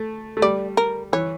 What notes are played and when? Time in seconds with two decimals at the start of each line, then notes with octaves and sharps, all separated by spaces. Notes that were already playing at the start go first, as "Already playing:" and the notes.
Already playing: A3
0.37 A3
0.42 G3 D5
0.77 A#4
1.13 E3 C#5